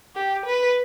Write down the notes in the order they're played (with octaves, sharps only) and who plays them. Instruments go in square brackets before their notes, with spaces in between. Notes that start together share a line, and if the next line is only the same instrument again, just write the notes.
[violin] G4
B4